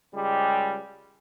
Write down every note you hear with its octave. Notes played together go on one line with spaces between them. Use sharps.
C#2 G3 G#3 G4